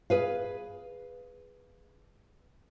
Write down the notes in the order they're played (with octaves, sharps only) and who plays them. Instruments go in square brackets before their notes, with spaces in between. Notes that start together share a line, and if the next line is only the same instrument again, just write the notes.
[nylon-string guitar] G#4 B4 F5